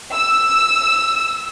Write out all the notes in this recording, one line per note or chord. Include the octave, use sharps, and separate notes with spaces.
E6